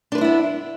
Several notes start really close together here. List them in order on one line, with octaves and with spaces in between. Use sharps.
D4 B4 C5 E4 B3